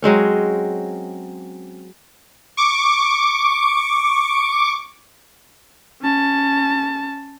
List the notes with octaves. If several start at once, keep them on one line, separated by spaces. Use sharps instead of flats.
F#3 G#3 C4 C#4
C#6 D6
C#4 A5